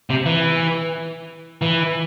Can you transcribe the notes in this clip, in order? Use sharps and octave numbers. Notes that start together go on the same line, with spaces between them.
C3
E3
E3